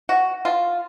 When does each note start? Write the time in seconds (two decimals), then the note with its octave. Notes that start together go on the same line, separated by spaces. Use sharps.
0.09 F#4
0.45 F4